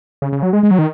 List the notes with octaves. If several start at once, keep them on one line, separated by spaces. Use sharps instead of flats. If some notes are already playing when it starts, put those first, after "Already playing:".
C#3
C#3
F#3
G#3
G#3
F#3
D#3